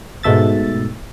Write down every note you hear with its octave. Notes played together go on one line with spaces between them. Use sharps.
G#2 B2 A3 E5 A6